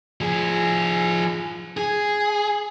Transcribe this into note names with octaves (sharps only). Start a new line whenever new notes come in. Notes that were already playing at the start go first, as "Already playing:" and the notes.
F3 G#4
G#4